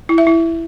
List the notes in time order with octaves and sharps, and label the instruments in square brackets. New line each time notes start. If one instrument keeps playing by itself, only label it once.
[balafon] E4
E5
E4